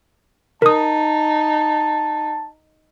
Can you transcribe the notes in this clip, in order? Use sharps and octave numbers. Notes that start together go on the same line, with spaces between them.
D#4 A#4 A5 D#6